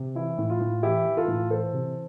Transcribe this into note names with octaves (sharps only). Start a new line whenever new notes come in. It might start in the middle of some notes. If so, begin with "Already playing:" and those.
Already playing: C3
E3 E4
A2
F4
A2
E3 E4 G4
E3
F4 A4
A2
E3 A4 C5
C3